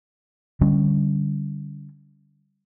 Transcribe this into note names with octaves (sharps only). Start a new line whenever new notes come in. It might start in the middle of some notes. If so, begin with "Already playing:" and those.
D3 G3 C#4